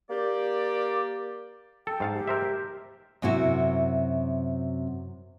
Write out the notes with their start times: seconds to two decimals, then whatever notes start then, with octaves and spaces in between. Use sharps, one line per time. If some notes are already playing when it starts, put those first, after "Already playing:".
0.10 A#3 G4 D5
1.87 A4 G5
2.00 G#2 F5 A5
2.14 G4
2.27 A#4 C5 E5
3.22 F#2 C3 E4 F#4